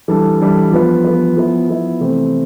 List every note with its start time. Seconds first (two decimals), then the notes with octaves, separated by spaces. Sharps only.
0.08 E3 G3 D4 A4
0.40 E3 G3 D4 A4
0.72 F3 B3 F4 B4
1.04 F3 B3 F4 B4
1.37 F3 B3 E4
1.68 F3 B3 E4
2.00 C3 E3 A3 C4